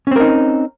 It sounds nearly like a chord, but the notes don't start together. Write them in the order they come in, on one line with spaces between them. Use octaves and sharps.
C#4 C4 A#4 D#4